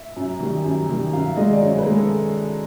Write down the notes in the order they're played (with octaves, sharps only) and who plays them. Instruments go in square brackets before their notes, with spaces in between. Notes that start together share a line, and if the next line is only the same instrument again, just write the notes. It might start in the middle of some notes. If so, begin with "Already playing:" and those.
Already playing: [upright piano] E5
F#2
D#3 G3
F#2
D#3 G3
F#2 F5
E5
D#3 G#3 D#5
D5
F#2 C#5
B4
D#3 G#3
A4